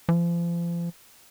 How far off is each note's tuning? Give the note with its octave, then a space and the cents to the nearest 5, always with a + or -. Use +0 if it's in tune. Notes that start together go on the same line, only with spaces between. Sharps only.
F3 -35